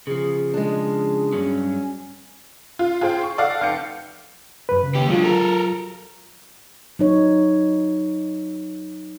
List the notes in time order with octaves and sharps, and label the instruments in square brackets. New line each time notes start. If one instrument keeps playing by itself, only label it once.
[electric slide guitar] C#3 F3 [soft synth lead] G#4
[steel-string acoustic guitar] G#3 D4
[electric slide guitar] G2 F#3 [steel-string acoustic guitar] C#4
[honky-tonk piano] F4
F4 G#4 C5 G5
C#6
A4 D5 F5 F#5
F1 F5 G5 G6 C#7
[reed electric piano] F#2 B4
C#3
[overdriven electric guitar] D#2 G4
[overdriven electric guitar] D3 G#3 [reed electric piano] F#3 F4
[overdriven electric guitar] A4 A#4
[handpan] F#3 D#4 C#5